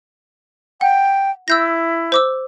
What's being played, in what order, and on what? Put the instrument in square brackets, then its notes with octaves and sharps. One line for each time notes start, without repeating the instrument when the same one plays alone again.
[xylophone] F#5 [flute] G5
[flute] E4 [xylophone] E6 G6 A#6
[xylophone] C5 D6 E6